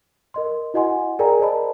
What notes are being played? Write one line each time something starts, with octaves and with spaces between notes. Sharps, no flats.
A#4 D#5 C6
E4 F#4 D#5 F#5 G#5 C6
G#4 A#4 D5 G5 G#5 A#5
A#4 C5 D5 D#5 A5 B5